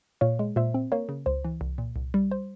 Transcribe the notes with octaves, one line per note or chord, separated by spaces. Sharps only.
A#2 C#5 F5
G#3
A#2 C5 E5
C4
A#3 A#4 C#5
C#3
C#2 C5
E3
C2
A#2
C2
G3
C5